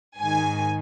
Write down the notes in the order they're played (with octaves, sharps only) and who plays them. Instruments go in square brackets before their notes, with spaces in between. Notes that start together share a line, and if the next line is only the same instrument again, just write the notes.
[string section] G#2 D#3 G#5